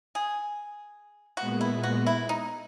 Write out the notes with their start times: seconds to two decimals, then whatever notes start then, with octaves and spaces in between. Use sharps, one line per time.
0.15 G#4
1.37 A#2 G#3 B3 F#4
1.61 E4
1.84 F#4
2.06 E4
2.29 D#4